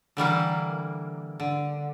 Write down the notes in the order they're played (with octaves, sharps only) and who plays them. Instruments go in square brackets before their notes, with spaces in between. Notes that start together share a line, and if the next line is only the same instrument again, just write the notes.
[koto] D3 E3 G3 A#3
D3